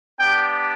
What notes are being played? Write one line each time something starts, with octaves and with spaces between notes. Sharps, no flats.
B3 D4 G4 G5